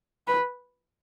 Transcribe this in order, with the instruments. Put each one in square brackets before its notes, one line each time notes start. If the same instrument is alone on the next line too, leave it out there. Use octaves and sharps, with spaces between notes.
[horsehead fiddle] B4